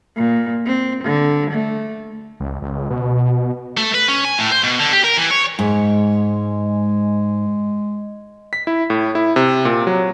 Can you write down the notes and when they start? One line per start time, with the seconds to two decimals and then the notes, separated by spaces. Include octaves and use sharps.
0.16 A#2
0.66 C4
1.04 D3
1.51 A3
2.40 C#2
2.62 C#2
2.90 B2
3.77 A3
3.94 B4
4.08 C#4
4.25 G#5
4.38 A2
4.52 C5
4.64 B2
4.80 D3
4.93 G4
5.04 A#4
5.17 E3
5.31 C#5
5.59 G#2 G#3
8.53 B6
8.67 E4
8.90 A2
9.15 E4
9.36 C3
9.65 A#2
9.87 F#3